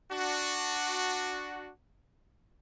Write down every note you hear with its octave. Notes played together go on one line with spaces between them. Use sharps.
D4 F#4